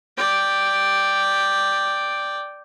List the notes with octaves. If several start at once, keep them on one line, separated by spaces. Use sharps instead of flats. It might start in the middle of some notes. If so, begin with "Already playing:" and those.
D5 G5